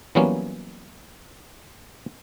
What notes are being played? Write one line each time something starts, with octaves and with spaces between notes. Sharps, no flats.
E3 F#3 G3 A#3 B3 C#4